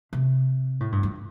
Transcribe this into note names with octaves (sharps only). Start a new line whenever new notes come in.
C3
A2
G2
F2